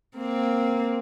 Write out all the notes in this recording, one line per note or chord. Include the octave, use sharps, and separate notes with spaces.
A#3 C4